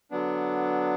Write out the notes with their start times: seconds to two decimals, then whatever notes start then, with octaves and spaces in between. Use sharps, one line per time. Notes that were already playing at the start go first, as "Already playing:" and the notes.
0.11 D3 F#3 B3 D4